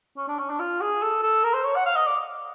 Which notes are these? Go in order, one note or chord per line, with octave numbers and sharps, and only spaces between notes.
C#4
D4
C#4
D4
F4
G#4
A4
A4
A#4
C5
C#5
F#5
F5
D#5
D5